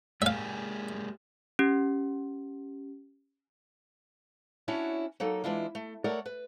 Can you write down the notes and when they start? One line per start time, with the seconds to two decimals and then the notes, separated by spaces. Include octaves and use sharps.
0.22 G#3 A#3 G4 E5 F5
1.59 C#4 G4
4.68 C#4 D4 E4 F#4 C#5
5.20 F#3 A#3 D#4 A4
5.44 E3 G#3 D4 E4 F4
5.75 A3
6.04 A3 A4 A#4 C#5 D5 F#5
6.26 B4